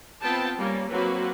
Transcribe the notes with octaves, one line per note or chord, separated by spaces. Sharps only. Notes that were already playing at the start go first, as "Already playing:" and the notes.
B3 C4 F4 G5 A5
G3 A#3 C#4
F#3 A#3 C4 F#4 B4